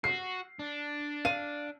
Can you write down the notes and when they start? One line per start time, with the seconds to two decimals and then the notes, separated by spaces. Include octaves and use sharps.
0.04 F#4 C7
0.59 D4
1.25 F5 D#7